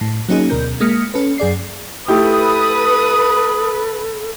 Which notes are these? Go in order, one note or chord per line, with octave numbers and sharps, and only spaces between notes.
A2
F#3 A#3 C#4 D#4 G#4
D2 B2 A#4 G6
G#3 A#3 D#6 F6 B6 C#7
C#4 A4 B4
F#2 G#4 D5 C7
A3 E4 G4 A4 B4 D#6